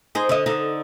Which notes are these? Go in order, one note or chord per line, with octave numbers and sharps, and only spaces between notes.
D#4 G#4 C5
D3 D#5
D3 D#4